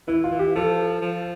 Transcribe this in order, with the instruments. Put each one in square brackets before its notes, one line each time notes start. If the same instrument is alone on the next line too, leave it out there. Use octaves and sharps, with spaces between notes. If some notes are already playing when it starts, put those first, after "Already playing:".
[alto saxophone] E3 [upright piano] E4
[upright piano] F4
[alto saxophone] E3
[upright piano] G4
[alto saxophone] F3 [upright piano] A4
[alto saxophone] F3